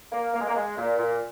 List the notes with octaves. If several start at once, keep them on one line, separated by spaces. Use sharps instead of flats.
A#3
A#3
G#3
A#3
G#3
A#2
A#2